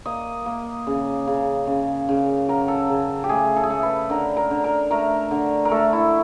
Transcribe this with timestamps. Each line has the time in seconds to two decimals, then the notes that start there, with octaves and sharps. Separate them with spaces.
0.06 A#3 D#5
0.46 A#3
0.87 C#3
1.27 C#3
1.67 C#3
2.09 C#3
2.48 F#3 A#4
2.68 A4
2.89 C#3
3.24 G4
3.29 A3 G#4
3.56 A4
3.63 G#4
3.70 A3 A4
3.83 B4
4.10 D3 A#4
4.37 A#4
4.51 D3
4.64 A#4
4.91 A3 A#4
5.31 D3
5.65 A#4
5.71 A3 A4
5.93 E4